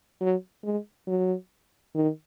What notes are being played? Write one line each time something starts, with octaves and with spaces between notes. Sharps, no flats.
F#3
G#3
F#3
D#3